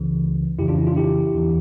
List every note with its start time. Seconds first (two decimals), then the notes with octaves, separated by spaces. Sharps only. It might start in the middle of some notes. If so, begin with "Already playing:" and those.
Already playing: C#2 C#3 E3
0.59 F2 C#3 E3 E4 G4
0.68 D4 F4
0.78 C#4 E4
0.87 D4 F4
0.96 E4 G4
1.34 E2 E3